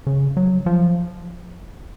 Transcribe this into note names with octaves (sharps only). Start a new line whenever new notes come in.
C#3
F#3
F3